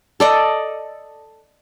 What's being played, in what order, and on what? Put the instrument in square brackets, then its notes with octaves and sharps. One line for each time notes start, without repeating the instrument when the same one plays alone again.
[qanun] A4 D5 D#5